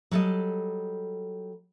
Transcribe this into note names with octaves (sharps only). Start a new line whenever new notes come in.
F#3 G3 A4 D5 D#5